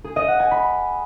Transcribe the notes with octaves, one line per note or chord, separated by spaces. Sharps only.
G#4
D#5
F#5
G#5
B5